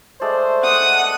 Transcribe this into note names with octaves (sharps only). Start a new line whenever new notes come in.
G#3 A3 C5 D5
F#5 D#6